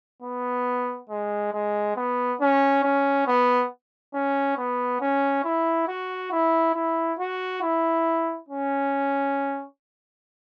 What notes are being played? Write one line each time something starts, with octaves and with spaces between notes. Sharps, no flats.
B3
G#3
G#3
B3
C#4
C#4
B3
C#4
B3
C#4
E4
F#4
E4
E4
F#4
E4
C#4